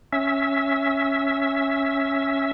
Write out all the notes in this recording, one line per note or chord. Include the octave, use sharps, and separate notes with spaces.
C#4 E5